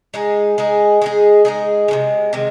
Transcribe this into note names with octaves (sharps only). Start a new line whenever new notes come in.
G#3 D#4 G#4
G#3 D#4 G#4
G#3 D#4 G#4
G#3 D#4 G#4
C3 D#3 G#3
C3 D#3 G#3